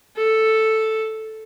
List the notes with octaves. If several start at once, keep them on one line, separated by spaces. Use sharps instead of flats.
A4